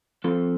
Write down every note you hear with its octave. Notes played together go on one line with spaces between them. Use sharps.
F3 C4 F4 A4